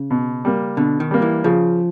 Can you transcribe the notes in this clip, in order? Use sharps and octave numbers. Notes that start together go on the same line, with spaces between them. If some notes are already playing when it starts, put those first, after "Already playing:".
Already playing: C#3
B2
G3 A#3
B2 D3
D#3
G3 A#3
E3
C#3 F3